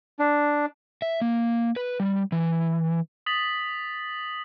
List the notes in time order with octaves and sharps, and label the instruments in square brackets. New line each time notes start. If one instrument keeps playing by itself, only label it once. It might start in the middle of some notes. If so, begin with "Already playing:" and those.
[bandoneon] D4
[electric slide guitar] E5
A#3
B4
G3
E3
[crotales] D#6 A6 B6 F#7